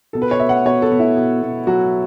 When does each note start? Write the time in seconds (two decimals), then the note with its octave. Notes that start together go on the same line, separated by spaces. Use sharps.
0.13 B2 A4
0.22 B4
0.31 C#5
0.40 B2 E5
0.49 F#5
0.65 B2 C#5
0.82 A4
0.92 B2
0.99 E4
1.17 B2
1.42 B2
1.67 F#3 F#4